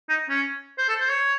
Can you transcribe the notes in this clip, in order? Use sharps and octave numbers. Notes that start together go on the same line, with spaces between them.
D#4
C#4
C5
A4
C5
C#5